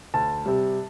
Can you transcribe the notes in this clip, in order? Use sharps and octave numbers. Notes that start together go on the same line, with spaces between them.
D2 A5
C3 G3